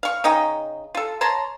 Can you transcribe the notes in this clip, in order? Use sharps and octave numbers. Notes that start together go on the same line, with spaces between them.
F5 C#6
C#3 D#4 D#5 G5
F4 A4
C#5 A5 A#5 C6